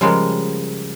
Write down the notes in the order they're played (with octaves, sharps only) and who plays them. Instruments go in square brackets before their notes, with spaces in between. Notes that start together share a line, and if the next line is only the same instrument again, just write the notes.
[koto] C#3 F3 G3 G#3 A#3